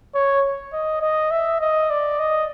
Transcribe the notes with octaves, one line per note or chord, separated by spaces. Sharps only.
C#5
D#5
D#5
E5
D#5
D5
D#5